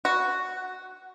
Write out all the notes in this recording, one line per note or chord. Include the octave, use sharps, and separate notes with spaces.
F#4